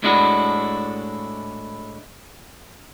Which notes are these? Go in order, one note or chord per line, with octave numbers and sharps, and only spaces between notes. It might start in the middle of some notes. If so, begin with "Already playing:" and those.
A2 G#3 D4 E4 F#4